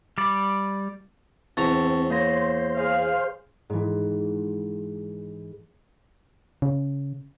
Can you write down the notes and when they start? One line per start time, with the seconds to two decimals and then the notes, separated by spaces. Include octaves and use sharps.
0.18 G3 D5
1.57 E2 C4 A5 A#5 C#6 A6
2.10 A#3 C5 C#5 A#6
2.75 G#4 F5
3.70 G#2 E3
6.62 C#3